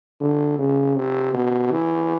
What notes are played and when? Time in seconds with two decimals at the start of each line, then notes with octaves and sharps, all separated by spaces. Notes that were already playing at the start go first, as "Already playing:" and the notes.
0.20 D3
0.58 C#3
0.96 C3
1.34 B2
1.71 E3